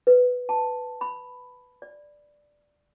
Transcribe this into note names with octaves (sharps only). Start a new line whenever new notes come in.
B4
A5
B5
D5